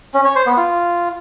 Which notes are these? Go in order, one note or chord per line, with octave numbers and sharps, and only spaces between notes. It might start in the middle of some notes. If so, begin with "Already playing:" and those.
C#4
C#5
C5
B3
F4